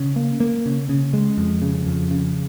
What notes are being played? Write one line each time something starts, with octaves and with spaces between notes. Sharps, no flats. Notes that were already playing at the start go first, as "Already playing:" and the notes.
Already playing: C#3
A#3
A#3
C#3
C#3
G#3
F2
C#3
F2
C#3